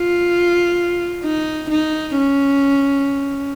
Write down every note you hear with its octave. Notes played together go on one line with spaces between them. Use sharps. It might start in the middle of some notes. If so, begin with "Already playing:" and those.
Already playing: F4
D#4
D#4
C#4